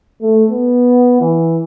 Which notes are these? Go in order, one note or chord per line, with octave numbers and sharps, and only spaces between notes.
A3
B3
E3